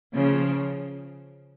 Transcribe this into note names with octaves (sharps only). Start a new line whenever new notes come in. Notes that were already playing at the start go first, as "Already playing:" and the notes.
C#3 F3